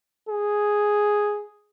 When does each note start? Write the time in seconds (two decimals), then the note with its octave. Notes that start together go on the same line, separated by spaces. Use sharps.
0.29 G#4